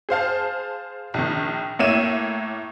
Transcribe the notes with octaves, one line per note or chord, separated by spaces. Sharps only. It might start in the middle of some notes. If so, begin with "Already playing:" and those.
G#4 C5 F5 A5
A#1 D#3
A2 A#3 C#5 E5 D#7 E7